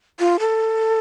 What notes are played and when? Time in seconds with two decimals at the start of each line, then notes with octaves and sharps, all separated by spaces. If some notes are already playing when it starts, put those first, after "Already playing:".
0.19 F4
0.40 A4